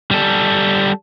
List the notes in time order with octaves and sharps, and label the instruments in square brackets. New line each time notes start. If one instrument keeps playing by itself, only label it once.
[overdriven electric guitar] G3 A4